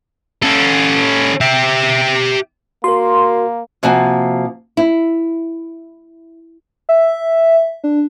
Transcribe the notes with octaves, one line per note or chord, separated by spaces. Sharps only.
C#4 A4
G4 E5
A#3 F#4 A#4 C6
C3 F3 A#3 F#4 G#5
E4
E5
D4